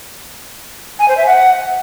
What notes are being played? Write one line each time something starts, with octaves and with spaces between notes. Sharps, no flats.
G#5
C5
E5
F#5